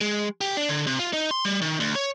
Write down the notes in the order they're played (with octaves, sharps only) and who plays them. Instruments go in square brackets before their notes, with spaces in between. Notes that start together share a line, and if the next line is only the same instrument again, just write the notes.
[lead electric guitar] G#3
G4
D4
D3
C3
F4
D#4
C6
G3
D#3
D2
C#5